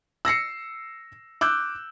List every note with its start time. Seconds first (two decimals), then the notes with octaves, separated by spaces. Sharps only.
0.25 E6 A#6 C7 C#7
1.41 D6 E6 F#6 G6